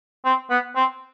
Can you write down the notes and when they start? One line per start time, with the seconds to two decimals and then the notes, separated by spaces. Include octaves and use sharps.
0.25 C4
0.50 B3
0.76 C4